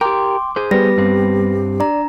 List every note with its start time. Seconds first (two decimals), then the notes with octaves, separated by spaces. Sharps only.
0.01 G4 A#4 G5 C6 D6
0.56 G#4 C5
0.71 G3 B3 G4 B4 A#6
0.98 G2 C4
1.80 D4 D5 A#5